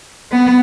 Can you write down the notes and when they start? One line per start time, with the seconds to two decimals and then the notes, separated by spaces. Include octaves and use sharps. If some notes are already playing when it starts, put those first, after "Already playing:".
0.32 B3